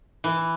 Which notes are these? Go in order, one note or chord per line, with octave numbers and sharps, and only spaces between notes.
E3